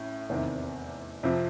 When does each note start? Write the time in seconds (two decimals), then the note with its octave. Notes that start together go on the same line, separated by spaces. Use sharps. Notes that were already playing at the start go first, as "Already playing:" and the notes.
Already playing: A1 A2 C#4
0.29 F1 E2 C3 D#3
1.23 F2 C3 F3